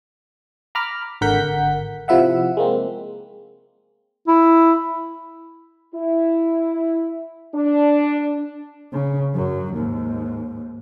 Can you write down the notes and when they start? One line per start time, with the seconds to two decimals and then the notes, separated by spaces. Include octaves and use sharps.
0.75 A#5 B5 D6 F6
1.21 G#1 D3 A#4 F#5 G6 B6
2.08 C3 F3 E4 E5 F#5
2.57 G#3 A#3 C4
4.28 E4
5.95 E4
7.55 D4
8.93 C#3
9.34 F#2 F#3
9.74 D#2 G#2